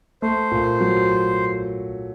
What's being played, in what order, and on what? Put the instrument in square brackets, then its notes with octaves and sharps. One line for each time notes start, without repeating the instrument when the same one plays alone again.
[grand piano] A3 [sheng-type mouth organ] C5
[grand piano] A#2
F#3